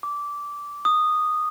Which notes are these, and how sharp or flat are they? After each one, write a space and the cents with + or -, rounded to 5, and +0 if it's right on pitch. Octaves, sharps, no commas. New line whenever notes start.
D6 -15
D#6 -10